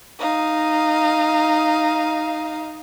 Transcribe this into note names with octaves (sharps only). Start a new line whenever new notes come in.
D#4 F5